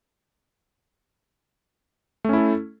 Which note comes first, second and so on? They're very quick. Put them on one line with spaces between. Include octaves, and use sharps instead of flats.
A3 C#4 E4 A4